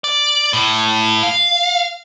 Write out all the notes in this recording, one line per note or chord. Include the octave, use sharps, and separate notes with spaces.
D5
A2
F5